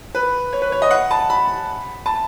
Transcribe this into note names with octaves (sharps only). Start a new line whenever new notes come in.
B4
C#5
B4
C#5
D#5
F#5
A5
B5
A5